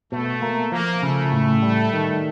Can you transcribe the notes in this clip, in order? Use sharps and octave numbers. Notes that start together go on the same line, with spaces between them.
B2 A3
A#3
F3 A#3
C#3 A3
A2
G3
D#3